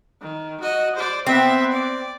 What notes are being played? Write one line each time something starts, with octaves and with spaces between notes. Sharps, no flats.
D#3
F#4 D#5
C5 D5
B3 C4 E5
D5